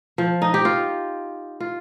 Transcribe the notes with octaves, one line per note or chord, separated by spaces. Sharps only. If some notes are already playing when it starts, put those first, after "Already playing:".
F3
D#4
G4
F4
F4